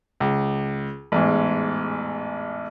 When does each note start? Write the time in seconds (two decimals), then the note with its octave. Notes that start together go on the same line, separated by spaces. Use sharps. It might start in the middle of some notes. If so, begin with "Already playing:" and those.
0.20 C#2
1.12 A1 E2 G#2